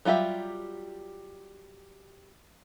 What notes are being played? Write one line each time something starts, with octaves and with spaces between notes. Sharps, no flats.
F#3 G3 F4 G4 E5